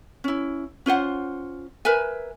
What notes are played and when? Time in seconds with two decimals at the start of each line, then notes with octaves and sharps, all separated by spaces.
0.24 C#4 E4
0.86 C#4 F4 C5 F#5
1.85 A#4 B4 E5 G#5